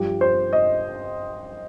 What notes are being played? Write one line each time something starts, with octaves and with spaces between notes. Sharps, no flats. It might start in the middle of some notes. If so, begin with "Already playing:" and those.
Already playing: G2 F3 G4
C5
D#5